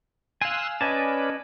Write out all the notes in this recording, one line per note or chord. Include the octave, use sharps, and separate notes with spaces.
F5 G#5 C6 E6 F#6
C#4 B4 D5 D#5 G#5 A5